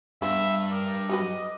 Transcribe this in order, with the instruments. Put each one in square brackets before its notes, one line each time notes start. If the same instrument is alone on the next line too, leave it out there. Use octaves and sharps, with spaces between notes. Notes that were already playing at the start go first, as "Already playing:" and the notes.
[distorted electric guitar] G2 [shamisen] B3 F4 [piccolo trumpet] E5
[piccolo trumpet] A#4 [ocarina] D6
[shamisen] G3 F#4 B4 [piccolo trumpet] D#5